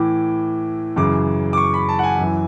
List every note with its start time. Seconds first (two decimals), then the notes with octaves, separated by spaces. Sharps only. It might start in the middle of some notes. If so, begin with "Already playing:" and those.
Already playing: A2 E3 D6
0.96 F#2 C#3 E3 D6
1.53 D6
1.57 C#6
1.74 B5
1.89 A5
1.99 F#5
2.03 G#5
2.19 F#2 E3